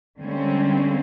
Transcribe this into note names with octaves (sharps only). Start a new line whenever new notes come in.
D3 G3 G#3 A#3 C4 C#4